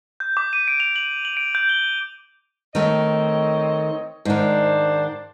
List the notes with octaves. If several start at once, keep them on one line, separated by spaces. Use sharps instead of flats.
G6
D6
D#7
D7
F7
F#7
F#7
D7
G6
G7
D#3 A3 C4 C#5 D#5
G#2 D#3 D4 C5 D5